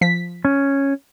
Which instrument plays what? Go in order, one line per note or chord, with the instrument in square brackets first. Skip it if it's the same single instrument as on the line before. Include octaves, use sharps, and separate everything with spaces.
[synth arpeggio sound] F3 B6
[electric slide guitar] C#4